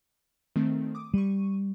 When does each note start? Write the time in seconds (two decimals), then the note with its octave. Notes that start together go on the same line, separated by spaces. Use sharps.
0.56 D#3 A3 C4
0.95 D6 D#6
1.14 G3 C#6 D#7